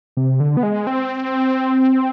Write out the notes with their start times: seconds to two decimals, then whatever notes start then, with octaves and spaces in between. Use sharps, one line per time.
0.17 C3
0.40 D3
0.57 B3
0.63 G#3
0.87 C4